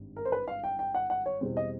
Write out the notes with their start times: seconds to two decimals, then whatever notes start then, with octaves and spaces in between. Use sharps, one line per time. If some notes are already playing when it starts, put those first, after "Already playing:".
Already playing: G#1 G2
0.16 A#4
0.25 C5
0.32 B4
0.48 F5
0.64 G5
0.79 G5
0.95 F#5
1.10 F#5
1.26 C#5
1.41 E2 B2 G3 C4
1.57 D#5